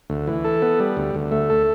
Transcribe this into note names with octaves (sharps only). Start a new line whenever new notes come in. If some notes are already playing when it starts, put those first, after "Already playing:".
D2
E3
A4
B3
G3
D2
D2
A3
A4